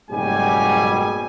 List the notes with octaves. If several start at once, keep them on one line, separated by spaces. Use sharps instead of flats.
F#1 G#2 B2 G3 G4 G#5